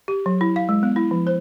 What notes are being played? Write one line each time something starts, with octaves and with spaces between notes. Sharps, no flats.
G4
F#3
E4
F5
G#3
B3
E4
F3
C5